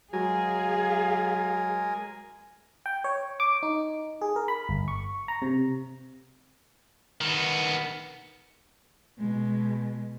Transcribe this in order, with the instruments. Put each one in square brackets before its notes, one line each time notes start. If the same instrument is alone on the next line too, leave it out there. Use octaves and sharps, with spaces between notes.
[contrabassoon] F#3 [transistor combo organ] G#3 A#4 G#5 [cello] G#4 F5
[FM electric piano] G5
C#5
D6
D#4
G#4
A#4
B5
G1
C#6
A#5
C3
[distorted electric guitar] D#3 B3
[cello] B2 G#3